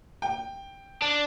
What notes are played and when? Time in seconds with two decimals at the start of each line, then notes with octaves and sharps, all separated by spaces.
0.22 G5
1.02 D4